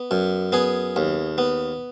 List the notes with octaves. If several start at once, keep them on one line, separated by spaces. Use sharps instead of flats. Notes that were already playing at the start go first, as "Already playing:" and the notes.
Already playing: B3
F#2
B3 G#4
D#2
B3